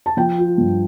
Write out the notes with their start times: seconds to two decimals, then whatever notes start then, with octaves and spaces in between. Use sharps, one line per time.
0.06 A5
0.17 F3 G5
0.38 F4
0.58 G2